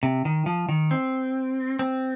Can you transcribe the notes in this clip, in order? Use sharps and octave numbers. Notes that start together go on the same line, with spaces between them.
C3
D#3
F3
D#3
C4
C4